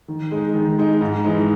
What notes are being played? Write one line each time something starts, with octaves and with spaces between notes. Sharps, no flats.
D#3
G#3 D#4
D#3
G#3 D#4
G#2
E3 G#3 D#4